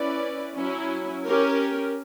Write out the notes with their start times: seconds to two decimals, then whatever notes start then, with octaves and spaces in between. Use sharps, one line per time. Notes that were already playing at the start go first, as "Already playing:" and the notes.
Already playing: C#4 E4 B4 D5
0.57 F#3 C#4 E4
1.26 C#4 G4 A#4